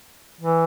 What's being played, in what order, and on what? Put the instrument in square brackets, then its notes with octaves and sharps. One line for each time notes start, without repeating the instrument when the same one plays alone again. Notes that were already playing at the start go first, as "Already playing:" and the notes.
[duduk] E3